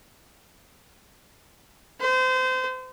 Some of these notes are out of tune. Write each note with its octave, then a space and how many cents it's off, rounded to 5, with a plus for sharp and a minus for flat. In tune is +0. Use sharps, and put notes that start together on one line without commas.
C5 -30